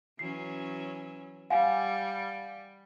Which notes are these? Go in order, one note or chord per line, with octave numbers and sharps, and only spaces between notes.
E3 F#3 C#4 C7
G3 F5 F#5 G#5